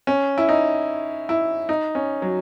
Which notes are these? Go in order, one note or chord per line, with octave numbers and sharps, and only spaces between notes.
C#4
E4
D#4
E4
D#4
C#4
F#3